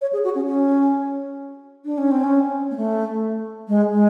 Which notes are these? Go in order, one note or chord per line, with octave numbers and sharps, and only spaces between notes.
C#5
G#4
F#4
C#4
C#4
D4
C#4
C4
C#4
A#3
A3
G#3
G#3